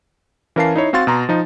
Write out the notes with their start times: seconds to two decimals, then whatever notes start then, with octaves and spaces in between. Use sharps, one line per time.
0.56 E3 C#4 A#4 F5 A5 C7
0.76 D#4 E4 C#5
0.93 C4 F#4 F5 C6 A6
1.07 B2 A#5 C6
1.29 F3 D#4